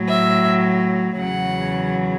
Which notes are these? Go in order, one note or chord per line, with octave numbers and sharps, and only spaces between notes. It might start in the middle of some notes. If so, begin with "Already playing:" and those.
Already playing: A2 F#3
E5
E2 C#3 F#3 F#5